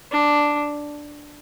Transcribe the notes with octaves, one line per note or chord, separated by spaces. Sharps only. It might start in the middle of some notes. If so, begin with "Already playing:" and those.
D4